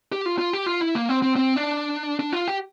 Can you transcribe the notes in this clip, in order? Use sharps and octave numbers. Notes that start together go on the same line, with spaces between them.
G4
F4
F4
G4
F4
E4
A#3
C4
C4
C4
D4
D4
F4
G4